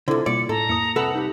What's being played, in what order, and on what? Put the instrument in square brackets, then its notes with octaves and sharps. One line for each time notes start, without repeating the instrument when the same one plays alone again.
[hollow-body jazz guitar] C2 D3 [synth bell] E4 F4 [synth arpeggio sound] A4 C5
[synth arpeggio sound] B2 G3 A#3 [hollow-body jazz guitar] D5 [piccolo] C#7
[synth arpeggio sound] A2 [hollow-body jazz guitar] A4 [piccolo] A#5
[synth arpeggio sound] F2 A#3 E4 [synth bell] D#6 C#7
[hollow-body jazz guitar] C2 A4 B4 [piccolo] F#5
[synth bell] D#4 G4